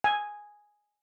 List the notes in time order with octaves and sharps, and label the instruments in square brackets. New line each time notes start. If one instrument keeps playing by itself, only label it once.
[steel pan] G#5